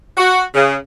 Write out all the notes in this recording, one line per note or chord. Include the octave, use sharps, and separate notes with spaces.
F#4
C#3